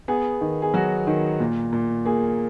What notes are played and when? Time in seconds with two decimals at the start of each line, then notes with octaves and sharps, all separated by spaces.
0.08 B3 G#4
0.41 D#3
0.62 G#4
0.74 F#3 F#4
1.07 D#3
1.40 A#2
1.73 A#2
2.06 A#3 G#4